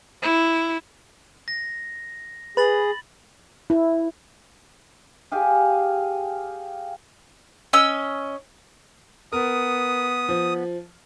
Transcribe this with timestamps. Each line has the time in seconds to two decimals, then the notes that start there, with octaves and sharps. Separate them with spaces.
0.22 E4
1.48 A#6
2.57 G#4 B4 B5 A6 F#7
3.70 E4
5.32 G4 G#4 F5 G#5
7.73 C#4 D#5 E6
9.32 B3 A#4 D#6
10.29 F3